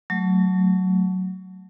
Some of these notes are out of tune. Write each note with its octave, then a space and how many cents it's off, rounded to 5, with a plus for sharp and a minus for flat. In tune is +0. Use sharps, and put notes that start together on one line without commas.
F#3 +0 A3 +0